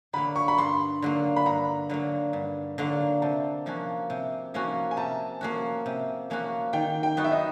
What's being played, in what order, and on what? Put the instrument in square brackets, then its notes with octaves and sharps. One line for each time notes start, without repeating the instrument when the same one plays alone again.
[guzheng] D3 F#3 A#3 [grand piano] B5
[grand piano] C#6
B5
[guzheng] G2 [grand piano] C6
[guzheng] D3 F#3 A#3
[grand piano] B5
[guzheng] G2 [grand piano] A#5
[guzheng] D3 F#3 A#3
G2
D3 F#3 A#3
[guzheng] C3 [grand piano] A5
[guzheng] F3 A#3 C#4 F#4
C3
F3 A#3 C#4 F#4
[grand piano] G#5
[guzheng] C3 [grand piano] A5
[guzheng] F3 A#3 C#4 F#4
C3
F3 A#3 C#4 F#4
[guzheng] D#3 [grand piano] G5
[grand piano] G5
[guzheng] F#3 B3 D#4 F#4
[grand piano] E5
D#5